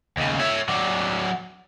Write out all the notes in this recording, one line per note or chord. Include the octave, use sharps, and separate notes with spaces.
D#2 C#3
C#5 E5
F#3 D4